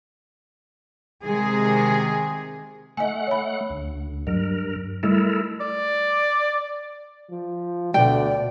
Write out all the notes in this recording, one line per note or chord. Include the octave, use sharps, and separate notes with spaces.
C3 D#3 G#3 G#4
A3 D#5 F#5 G#5
C#5 B5
D2
G2 F#3 A#4
G3 A3 E4 A4 A#4
D5
F3
D2 B2 D5 G5